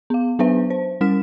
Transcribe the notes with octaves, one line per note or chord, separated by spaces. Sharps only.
B3 F5
F#3 B3 D4 B4 C5 E5
C5
G3 C#4 F6 B6 E7